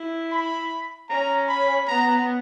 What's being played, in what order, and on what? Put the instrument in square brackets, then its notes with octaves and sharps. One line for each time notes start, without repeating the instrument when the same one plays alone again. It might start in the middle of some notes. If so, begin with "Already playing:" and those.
Already playing: [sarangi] E4
[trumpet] B5
[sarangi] C#4 [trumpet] A#5
[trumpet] B5
[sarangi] B3 [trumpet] A#5